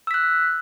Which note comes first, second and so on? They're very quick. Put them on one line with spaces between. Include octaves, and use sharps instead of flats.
E6 B6 F#6